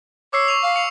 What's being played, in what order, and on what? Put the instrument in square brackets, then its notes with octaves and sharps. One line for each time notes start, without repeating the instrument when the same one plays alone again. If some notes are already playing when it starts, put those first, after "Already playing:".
[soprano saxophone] C#5 [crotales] D6 E6 C7
[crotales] C#6 F7
[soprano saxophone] F5
[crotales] C#7 F7